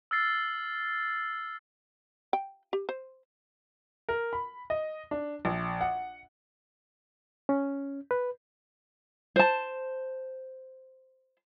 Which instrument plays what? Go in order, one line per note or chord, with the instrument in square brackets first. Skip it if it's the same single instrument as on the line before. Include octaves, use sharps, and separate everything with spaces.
[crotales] E6 F6 A6 C7
[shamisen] G5
G4
C5
[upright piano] A#4
B5
D#5
D4
A#1
F#5
[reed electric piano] C#4
B4
[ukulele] C5 A5